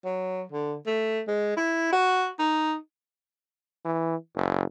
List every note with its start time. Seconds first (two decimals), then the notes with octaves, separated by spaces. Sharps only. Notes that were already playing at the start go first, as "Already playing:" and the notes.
0.05 F#3
0.52 D3
0.87 A3
1.28 G#3
1.57 E4
1.92 F#4
2.39 D#4
3.85 E3
4.35 F#1